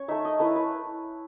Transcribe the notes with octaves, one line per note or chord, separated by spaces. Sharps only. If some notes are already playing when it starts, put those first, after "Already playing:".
Already playing: C#4 C#5
A3 D#4 E5
D#5
A3 E4 B4
B4